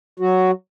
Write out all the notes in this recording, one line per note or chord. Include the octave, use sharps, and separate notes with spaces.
F#3 F#4